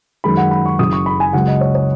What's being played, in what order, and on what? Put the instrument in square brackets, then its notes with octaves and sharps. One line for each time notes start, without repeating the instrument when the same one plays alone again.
[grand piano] F#2 D#3 G#3 B5
F#5
B5
C#6
F#1 F#2 C#3 D#6
C#6
B5
G#5
C#2 C#3 F#3 F#5
D#5
C#5
C#5